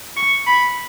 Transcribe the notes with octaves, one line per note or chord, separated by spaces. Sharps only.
C#6
B5